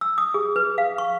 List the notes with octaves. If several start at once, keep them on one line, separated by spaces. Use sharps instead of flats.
E6
D#6
G#4
B4
F5
C#6